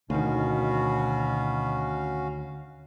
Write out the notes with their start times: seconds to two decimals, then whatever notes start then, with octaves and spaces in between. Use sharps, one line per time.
0.10 D2 B2 D#3 C#4 F#4 F5